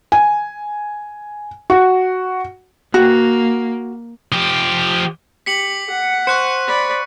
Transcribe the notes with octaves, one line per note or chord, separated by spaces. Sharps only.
G#5
F#4
A#3 F#4
F3 G4
G4 B6 C#7 F#7
F#5
C5 C#6 F#6 C#7
D5 B5